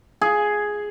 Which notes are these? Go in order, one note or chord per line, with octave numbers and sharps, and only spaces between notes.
G#4